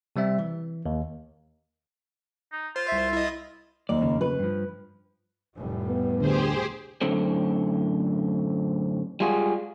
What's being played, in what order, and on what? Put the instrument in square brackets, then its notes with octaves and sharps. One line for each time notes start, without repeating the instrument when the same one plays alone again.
[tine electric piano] C3 G3 C4 E5
E3
D#2
[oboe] D#4
[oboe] F4 [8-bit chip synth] C5
[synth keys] C2 E5
[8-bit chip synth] E4 D#5
[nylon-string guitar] D#2 A#3 [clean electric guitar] D5
[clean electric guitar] F2 C#3
[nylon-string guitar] B4
[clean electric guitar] G2 F3
[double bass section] F1 A2 G3
[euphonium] B3
[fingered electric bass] D2 D3 [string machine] G4 G#4 C5
[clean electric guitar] F#2 A2 D3 C4
G3 G#3 F4 F#4 G#4